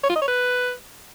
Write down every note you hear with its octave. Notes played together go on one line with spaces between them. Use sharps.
C#5
F4
D#5
C#5
B4